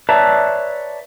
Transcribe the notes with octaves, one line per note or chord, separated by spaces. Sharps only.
B4 C#5 D5 E5 A5 A#5